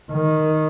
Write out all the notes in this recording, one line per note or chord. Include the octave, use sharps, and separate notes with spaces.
D#3